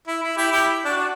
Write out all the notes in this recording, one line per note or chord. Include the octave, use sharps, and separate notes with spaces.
E4
E4
E4 G4
E4 G4
D4 F#4
D4